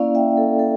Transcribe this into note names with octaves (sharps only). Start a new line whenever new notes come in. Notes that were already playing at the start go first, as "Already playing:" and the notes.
Already playing: A#3 C#4 E4 D5 F5
E5 G5
A4
A4